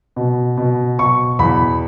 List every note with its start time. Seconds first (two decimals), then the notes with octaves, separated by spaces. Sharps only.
0.16 B2
0.58 B2
0.98 B2 C#6
1.39 E2 B5